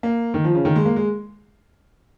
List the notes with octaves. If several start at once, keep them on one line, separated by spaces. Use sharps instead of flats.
A#3
D#3
F3
C#3
D#3
G#3
A#3
G#3